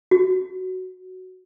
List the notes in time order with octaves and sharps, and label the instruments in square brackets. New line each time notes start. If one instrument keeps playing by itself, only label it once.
[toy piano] F#4